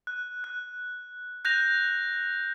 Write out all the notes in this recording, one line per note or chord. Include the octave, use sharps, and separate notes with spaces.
F#6
F#6
F#6 G6 A#6 F7